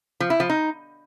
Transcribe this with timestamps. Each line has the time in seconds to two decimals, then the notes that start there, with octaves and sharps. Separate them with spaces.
0.20 F3
0.30 E4
0.40 F3
0.50 D#4